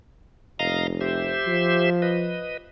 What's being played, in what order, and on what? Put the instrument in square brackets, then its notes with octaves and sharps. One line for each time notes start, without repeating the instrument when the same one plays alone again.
[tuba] F1 [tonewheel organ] D#5 F5 A#5
[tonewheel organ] G4 C5 E5
[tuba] F3
[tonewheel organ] B4 D#5